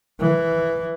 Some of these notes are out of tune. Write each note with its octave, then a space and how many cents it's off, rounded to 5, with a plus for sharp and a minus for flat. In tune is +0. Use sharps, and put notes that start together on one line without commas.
E3 +0